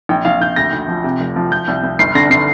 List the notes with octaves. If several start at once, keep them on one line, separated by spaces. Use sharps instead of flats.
A#1 G5
A#1 F5
A#1 G6
D2 A#6
D2
F3
C3
F1
F3
F3 G6
C2
C2
G1 C7
D3 A#6
D3 C7